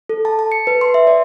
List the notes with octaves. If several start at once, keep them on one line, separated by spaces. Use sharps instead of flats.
A4
A5
A5
C#7
B4
C6
E5
D5